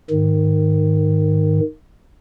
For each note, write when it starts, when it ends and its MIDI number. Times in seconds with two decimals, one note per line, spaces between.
0.10 1.60 44
0.10 1.60 51